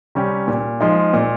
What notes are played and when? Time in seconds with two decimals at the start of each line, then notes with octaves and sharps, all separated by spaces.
0.15 C3 G3 C#4 G4
0.48 A#2
0.81 F3 G#3 D#4
1.13 A#2